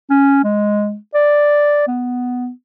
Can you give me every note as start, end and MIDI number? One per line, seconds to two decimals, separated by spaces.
0.10 0.41 61
0.44 0.96 56
1.14 1.85 74
1.88 2.50 59